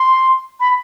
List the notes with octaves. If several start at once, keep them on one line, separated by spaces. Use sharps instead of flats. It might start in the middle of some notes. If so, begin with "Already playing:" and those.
Already playing: C6
B5